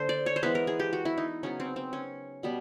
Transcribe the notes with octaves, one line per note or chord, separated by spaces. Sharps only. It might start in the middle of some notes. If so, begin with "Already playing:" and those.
Already playing: D3 A#3 A4 C5
D5
C#5
C5
E3 G#3 B3 B4
A#4
G#4
G4
F#4
E4
D#4
C#3 F#3 B3 C#4
C4
C4
C#4
B2 G3 B3